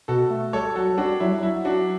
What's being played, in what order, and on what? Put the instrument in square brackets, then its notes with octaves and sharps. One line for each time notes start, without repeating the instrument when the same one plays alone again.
[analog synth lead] B2 [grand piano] F#4 A4
[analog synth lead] A3
[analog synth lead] G3 [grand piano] A4 C#5
[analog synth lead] F#3 [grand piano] F#4 A4
[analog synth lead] F#3
[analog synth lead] G3 [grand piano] D4 F#4
[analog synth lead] F#3 [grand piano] E4
[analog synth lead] G3
[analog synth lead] F#3 [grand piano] E4
[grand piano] D4 F#4